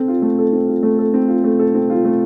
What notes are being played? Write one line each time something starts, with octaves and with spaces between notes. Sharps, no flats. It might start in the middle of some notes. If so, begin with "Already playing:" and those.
Already playing: C4 A4
F4
A3
A4
C4
F4
A3
A4
C4
F4
A3
A4
C4
F4
A3